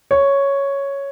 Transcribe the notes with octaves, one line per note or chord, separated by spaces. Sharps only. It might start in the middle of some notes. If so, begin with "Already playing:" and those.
C#5